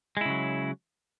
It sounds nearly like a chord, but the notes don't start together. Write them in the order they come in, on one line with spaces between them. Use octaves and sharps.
G#3 E4 C#3 F#3